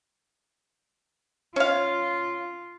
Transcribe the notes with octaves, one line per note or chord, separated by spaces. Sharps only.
C#4 F4 F5